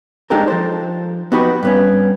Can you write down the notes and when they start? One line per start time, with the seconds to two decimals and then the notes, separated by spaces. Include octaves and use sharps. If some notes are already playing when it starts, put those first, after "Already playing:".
0.30 G#3 D4 D#4 G4 A4 A#4
0.48 F3 A4 C5
1.32 B3 D#4 F#4 G4 B4
1.63 G2 B3 C#4